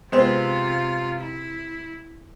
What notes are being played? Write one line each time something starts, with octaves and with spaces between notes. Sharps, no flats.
C3 G#3 B3 C4 F4
E4